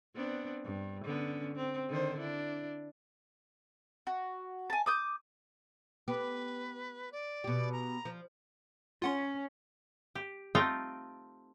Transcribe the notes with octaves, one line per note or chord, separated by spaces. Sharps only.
B3 C4 D4
G2
D3 B3 C#4
C4
D3 D#3 C5
D4 E4
F#4
G#5 A5
D6 D#6 G6
B3 G4 B4
D5
B2 G4
A#5
F3
C#4 F4 F#5 C6
G4
A3 C4 D#4 F4 D#5 G5